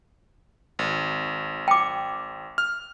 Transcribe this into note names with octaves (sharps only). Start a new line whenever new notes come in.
G#1
G5 D6
F6